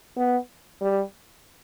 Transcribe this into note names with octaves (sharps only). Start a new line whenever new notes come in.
B3
G3